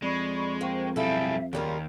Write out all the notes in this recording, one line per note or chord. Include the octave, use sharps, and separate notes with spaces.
F2 G#3 D5 B5 C#6
A#3 C5 G5 C#6
B1 G3 E4 G#4 A4 E5 F5
D#2 C#3 G3 F4 A#4